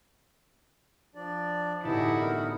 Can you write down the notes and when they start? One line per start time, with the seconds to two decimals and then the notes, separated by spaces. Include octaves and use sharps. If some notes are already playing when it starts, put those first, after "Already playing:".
1.15 F3 D4 D5
1.83 G1 A2 C3 E3 D#4 E4 F#4 A5
2.20 B3 D#4 A#4